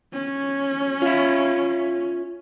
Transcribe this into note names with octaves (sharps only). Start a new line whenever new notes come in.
C#4
F4 E5